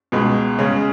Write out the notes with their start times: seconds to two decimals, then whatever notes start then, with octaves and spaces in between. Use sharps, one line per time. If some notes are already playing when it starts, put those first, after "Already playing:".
0.12 C#2 B2 G#3
0.59 C#3 G#3 C#4